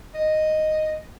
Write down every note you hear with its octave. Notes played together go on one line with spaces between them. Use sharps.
D#5